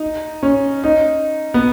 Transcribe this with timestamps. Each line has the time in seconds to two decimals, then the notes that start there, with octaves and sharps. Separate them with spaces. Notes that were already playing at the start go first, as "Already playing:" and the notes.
Already playing: D#4
0.43 C#4
0.84 D#4
1.54 B3